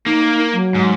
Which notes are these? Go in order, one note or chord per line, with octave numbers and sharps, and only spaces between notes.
A#3 D#4
F#3
G#2